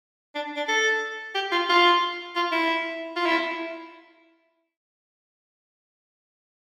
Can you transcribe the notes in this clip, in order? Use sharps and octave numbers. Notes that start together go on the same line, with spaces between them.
D4
D4
A4
G4
F4
F4
F4
E4
F4
E4